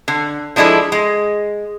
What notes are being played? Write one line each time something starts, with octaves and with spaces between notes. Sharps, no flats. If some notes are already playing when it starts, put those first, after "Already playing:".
D3
F3 G#3 D4 E4 A4
G#3